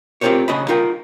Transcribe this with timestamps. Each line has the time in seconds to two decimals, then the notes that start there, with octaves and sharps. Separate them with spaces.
0.21 C4 F4 G4 A#4 C5 C#5
0.48 B1 C#3 F#4 D#5 B5
0.68 D#4 F4 A#4 G5